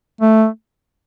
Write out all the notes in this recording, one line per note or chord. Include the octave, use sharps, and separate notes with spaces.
A3